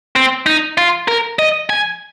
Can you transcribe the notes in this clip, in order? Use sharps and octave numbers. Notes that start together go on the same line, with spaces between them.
C4
D#4
F4
A#4
D#5
G#5